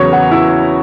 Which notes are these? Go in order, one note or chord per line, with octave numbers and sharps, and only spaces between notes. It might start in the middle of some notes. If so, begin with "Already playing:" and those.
Already playing: E2 C#3 F#3 B4 C#5
F#4
E4